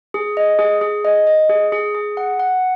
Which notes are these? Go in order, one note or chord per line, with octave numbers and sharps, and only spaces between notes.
G#4
D#5
G#4
G#4
D#5
D#5
G#4
G#4
G#4
F#5
F#5